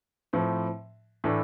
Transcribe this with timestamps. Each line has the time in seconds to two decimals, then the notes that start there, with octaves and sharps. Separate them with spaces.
0.33 A2 F3 C4
1.24 A2 E3 A3 D4